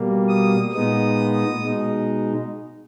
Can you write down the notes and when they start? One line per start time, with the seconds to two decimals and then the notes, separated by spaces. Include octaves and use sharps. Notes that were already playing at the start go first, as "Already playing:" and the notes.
Already playing: B2 G3 A#3
0.28 D#6
0.73 A#2 G#3 B3 D#4 D#6
1.62 B2 G#3 D#4